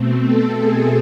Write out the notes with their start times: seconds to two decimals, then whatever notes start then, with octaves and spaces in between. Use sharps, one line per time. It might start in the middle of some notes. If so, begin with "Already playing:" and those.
Already playing: B2 A3 C4
0.24 A4
0.57 G#4